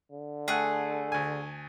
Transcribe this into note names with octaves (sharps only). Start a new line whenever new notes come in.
D3
A3 G#4 F#5
D2 G#5